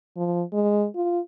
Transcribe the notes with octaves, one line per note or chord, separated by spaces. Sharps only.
F3
G#3
F4